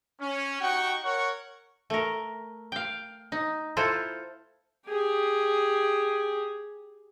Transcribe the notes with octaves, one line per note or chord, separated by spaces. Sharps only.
C#4
D#4 F#4 G4 F#5 G5 C#6
A#4 C#5 F#5 C#6
A3 A#4
F5 G5
D#4
E4 F4 A4 C5
G4 G#4